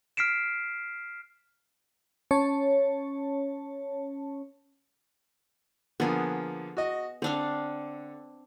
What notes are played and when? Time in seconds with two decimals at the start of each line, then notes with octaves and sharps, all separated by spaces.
0.17 F6 B6 C7 D7 E7
2.31 C#4 C#5 A5
6.00 D3 F3 A#3 B3 G#4
6.77 F#4 D#5
7.22 D3 C4 D4 F5